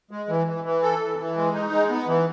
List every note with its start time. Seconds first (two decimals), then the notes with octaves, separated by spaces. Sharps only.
0.11 G#3
0.29 E3
0.47 E3
0.64 E3
0.83 A4
1.00 E3
1.19 E3
1.37 G#3
1.54 D#4
1.73 G#3
1.90 B3
2.07 E3